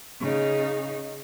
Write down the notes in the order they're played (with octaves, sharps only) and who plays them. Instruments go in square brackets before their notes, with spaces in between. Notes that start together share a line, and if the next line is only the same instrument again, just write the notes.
[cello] C#3 D#4